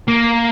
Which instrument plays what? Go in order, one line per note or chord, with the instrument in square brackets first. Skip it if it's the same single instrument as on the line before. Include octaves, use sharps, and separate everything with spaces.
[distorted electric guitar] A#3